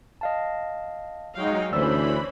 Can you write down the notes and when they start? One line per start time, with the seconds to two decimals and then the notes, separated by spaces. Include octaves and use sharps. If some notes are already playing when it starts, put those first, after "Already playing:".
0.21 D#5 F5 A5
1.36 F#3 G#3 D#4 F#4 F5 G5
1.73 D2 E3 C#4 D4 C5 D5 B5 E6